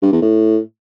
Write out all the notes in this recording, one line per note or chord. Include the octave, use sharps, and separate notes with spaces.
G2
E2
A2